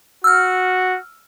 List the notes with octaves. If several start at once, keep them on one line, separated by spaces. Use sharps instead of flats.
F#4 E6 F6